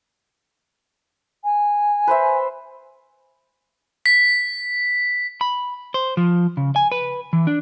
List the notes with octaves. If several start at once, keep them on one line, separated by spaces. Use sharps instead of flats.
G#5
B4 C5 E5
B6
B5
C5
F3
C#3
G#5
B4
E3
D4